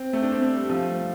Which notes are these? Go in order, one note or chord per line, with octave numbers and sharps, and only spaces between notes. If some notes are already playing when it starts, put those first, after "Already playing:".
Already playing: C4
A3
D4
C4
A3
G3
F3